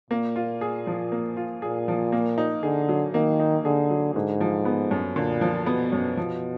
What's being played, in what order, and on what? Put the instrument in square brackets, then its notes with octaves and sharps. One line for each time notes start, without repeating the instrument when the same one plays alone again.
[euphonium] A#2 [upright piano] A#3
[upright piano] F4
G#4
F3
A#3
F4
[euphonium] A#2 [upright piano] G#4
[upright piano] F3
A#3
D#4
[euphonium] D3 [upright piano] G#4
[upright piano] F#3
[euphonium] D#3 [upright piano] A#3
[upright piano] D#4
[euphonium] D3 [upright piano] G#4
[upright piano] F#3
[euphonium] G#2 [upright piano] D3
[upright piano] F3
B3
F#2
[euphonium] A#2 [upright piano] D3
[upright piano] F3
[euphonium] B2 [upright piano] B3
[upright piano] F#2
F3